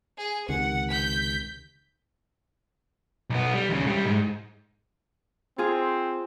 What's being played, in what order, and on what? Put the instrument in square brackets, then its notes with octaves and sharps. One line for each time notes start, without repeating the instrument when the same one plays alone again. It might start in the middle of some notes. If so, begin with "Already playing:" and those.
[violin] G#4
[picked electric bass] C#2 C3 D#3 [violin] F#5
[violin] G6 B6
[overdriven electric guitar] B1 B3
G3
D#2 C#3
C2 G3
G#2
[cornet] C4 [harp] F4 G#4